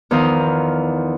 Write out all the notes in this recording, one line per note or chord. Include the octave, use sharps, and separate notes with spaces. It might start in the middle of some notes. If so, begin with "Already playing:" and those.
E2 D#3 F3 C5 D#5 F5